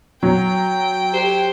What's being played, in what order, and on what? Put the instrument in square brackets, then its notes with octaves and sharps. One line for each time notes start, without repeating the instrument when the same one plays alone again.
[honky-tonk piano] F#3 [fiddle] G5
[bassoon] G4 [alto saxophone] C5